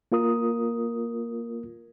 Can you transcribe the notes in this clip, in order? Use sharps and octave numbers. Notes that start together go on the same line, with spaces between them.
A#3 F4 A#4 D#6